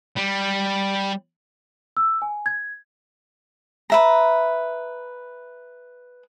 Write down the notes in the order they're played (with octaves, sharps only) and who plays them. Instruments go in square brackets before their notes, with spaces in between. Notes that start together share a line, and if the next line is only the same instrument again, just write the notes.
[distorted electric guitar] G3
[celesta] E6
G#5
G#6
[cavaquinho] B4 E5 A#5